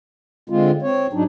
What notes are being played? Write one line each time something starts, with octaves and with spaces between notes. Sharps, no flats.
D3 G#3 C4 F4
C4 C#5
G#2 F#3 D4 D#4